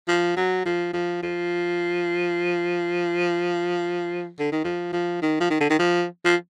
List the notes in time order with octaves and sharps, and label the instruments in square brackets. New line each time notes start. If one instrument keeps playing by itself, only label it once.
[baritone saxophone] F3
F#3
F3
F3
F3
D3
D#3
F3
F3
D#3
F3
D#3
D3
D#3
F3
F3